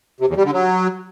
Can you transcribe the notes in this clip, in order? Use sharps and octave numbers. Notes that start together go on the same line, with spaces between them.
C3
E2
G3
D3
F#3